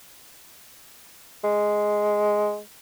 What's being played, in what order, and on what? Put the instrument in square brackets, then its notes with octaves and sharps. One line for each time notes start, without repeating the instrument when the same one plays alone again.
[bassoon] G#3